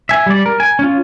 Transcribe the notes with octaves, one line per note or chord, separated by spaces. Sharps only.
E5 G#5
G3 D5
A#4
G#5
C#4 F4